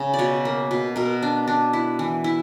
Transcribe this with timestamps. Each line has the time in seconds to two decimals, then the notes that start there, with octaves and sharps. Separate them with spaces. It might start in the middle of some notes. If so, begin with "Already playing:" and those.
Already playing: C#3
0.14 D5
0.19 B2 C#5
0.45 A#3
0.71 B2
0.96 B2 A#4
1.22 D4
1.47 D4
1.73 E4
1.99 E3
2.24 E4